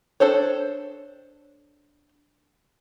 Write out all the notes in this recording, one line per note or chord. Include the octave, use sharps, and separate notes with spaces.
D4 A4 C5 C#5